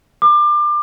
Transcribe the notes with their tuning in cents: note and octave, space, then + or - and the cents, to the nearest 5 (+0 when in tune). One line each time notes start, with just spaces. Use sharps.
D6 +30